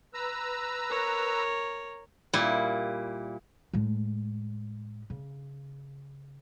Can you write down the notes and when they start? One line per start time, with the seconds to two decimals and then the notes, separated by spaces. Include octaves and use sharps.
0.14 B4 A#5 E6
0.90 A#4 C#5
2.33 A#2 G3 E4
3.73 A2 G#3
5.10 C#3